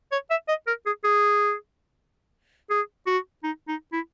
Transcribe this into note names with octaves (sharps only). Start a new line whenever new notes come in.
C#5
E5
D#5
A#4
G#4
G#4
G#4
F#4
D#4
D#4
E4